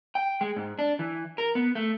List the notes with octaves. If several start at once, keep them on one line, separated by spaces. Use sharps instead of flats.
G5
G#3
G#2
D4
E3
A#4
B3
A3